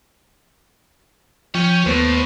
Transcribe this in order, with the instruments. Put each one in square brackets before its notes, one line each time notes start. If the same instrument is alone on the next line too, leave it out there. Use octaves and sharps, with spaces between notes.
[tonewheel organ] F3 G5 [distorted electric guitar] C#4 C#5
[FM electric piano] D#2 B3 [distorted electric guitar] A2 [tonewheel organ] C5